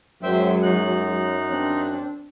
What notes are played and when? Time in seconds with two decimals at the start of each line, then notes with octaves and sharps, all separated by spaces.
0.23 F#2 F#3 G#3 C5 E5 G5
0.63 D#4 F#6
1.48 C4 D4